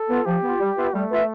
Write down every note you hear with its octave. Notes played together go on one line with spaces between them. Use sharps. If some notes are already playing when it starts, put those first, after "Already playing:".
Already playing: A4
B3 F4
F3 G4
B3 F4
G3
B3 F4 B4 E5
G3 A3
B3 F4 B4 E5